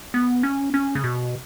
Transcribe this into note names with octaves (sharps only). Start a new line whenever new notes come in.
B3
C#4
C#4
C#3
B2